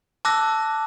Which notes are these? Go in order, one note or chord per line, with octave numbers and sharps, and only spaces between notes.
A5 D6 E6 F#6 A#6